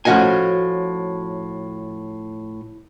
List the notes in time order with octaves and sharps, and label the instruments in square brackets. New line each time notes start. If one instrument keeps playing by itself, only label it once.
[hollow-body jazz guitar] A2 F3 C#4 F#4 D#5 G#5